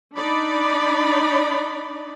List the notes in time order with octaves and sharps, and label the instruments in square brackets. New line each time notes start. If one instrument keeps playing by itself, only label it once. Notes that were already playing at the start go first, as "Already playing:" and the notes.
[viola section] D4 D#4 D5 B5